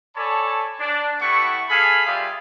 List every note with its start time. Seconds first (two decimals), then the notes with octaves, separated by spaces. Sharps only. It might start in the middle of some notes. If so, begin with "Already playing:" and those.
0.16 A4 C#5 D5 G#5 A5 B5
0.79 D4
1.21 G3 A3 B3 E4 F#5 C#6
1.69 G#4 A4 F5 G#5 B5
2.07 G3 F4 G#4 A#4 E5 F5